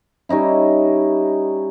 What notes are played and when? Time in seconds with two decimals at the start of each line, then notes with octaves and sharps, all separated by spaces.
0.29 G3 C#4 D#4 E4